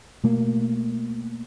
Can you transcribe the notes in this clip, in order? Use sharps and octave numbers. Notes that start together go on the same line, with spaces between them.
B2 A3 A#3